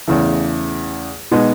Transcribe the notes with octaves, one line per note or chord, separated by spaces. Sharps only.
E2 C#3 E3 A3
B2 G#3 B3 D#4